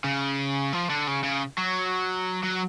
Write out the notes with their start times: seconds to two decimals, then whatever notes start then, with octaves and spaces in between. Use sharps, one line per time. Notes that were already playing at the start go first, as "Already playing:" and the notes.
0.04 C#3
0.73 F3
0.89 D3
1.07 C#3
1.23 C#3
1.58 F#3
2.44 F#3